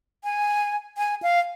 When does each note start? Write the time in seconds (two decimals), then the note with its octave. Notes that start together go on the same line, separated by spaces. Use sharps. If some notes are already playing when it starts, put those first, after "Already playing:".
0.24 G#5
0.98 G#5
1.23 F5